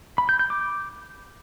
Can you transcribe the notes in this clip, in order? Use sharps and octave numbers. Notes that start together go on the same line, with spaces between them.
B5
G6
G6
D6